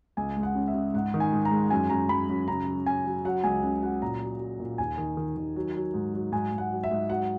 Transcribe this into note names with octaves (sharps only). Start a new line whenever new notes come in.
C#2 G#5
G#3
F#5
C#3
E5
C#3
G#2 F#5
D#3
G#5
G#2
A#5
G#3
F#2 G#5
F#2 A#5
F#2 B5
F#2
C#3 A#5
F#3
C#3 G#5
F#3
F#3 F#5
C#2 G#5
C#3
F#3 F#5
A#2 A#5
F#3
F#3
A#2
D#2 G#5
D#3
D#3
D#3
F#3
F#3
G#2
F#3
G#2 G#5
G#2
F#5
F#3
E5
G#2
F#3 F#5